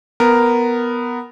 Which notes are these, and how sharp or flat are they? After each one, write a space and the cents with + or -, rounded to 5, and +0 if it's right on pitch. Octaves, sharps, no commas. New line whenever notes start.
B3 +0 A#4 +0